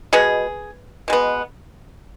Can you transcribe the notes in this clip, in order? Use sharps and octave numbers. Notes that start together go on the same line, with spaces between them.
B2 G#3 B3 G#4
B2 G#3 B3